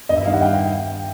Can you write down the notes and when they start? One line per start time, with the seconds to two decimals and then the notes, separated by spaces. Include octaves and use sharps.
0.09 G2 D#5
0.17 E5
0.26 D#3 G3 F5
0.34 F#5
0.42 G5